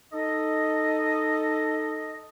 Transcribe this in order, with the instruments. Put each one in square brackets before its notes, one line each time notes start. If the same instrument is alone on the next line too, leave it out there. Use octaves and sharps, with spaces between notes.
[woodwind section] D#4 A4 D#5